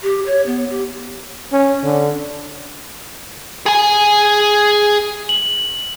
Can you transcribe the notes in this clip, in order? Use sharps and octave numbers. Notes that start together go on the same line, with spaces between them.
G4
C#5
B3
G4
C#4
D3
G#4 G#5
F#7